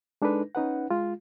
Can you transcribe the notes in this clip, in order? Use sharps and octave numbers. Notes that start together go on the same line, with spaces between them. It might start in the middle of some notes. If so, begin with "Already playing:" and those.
G#3 D4 D#4 A4 B4
C#4 D#4 B4 F#5
G#3 F4